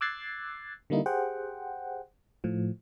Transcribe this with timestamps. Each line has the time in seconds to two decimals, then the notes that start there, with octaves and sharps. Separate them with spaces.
0.01 D6 E6 F#6 G#6 A6 C7
0.90 D3 G3 A#3 D#4 E4
1.06 G4 G#4 C5 F#5 G5
2.44 A2 F3